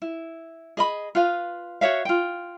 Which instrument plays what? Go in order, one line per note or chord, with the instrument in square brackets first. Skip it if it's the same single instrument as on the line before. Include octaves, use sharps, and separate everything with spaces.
[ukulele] E4
G#4 D#5 B5
F4 B4 F5
F#4 C#5 E5 F5
F4 G5